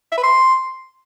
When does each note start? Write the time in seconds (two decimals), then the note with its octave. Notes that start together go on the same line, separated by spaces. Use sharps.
0.12 E5
0.17 B4
0.23 C6